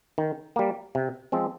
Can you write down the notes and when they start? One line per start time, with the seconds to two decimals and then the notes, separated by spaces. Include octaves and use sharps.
0.18 D#3
0.56 G3 A#3
0.95 C3
1.32 F3 G#3 C4